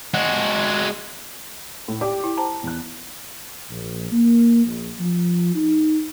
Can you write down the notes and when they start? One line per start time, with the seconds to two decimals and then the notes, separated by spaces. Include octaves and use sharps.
0.14 G#3 F#4
1.88 A2
2.01 G4 D5 G5 D6
2.24 E4
2.37 C5 A5 A#5
2.63 E2 F#6
3.69 A#1
4.11 A#3
4.65 A#1
4.99 F3
5.55 D#4